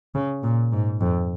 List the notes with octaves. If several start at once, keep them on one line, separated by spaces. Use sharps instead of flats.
C#3
A#2
G#2
F2